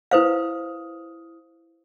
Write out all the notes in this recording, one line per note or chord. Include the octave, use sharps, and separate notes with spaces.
E4 B4 C5 F5 D#6 F6